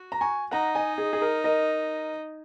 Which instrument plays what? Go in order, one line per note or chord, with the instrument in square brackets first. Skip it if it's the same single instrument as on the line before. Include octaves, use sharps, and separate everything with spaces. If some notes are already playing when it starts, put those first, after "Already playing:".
Already playing: [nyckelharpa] F#4
[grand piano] A#5
G#5 C#6
[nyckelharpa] D#4 [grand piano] F#5 A#5
[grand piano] D#5 G#5
G#4
G#4
A#4
A#4 D#5